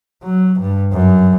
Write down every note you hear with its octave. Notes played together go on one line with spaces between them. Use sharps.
F#3
G2
F#2